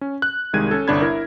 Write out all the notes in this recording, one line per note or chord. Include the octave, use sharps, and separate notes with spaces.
C#4
F#6
C2 D#3 G3 G#3 G#6 D#7
C#4 A4
G1 C2 D4 B5 G#6
E4 A#4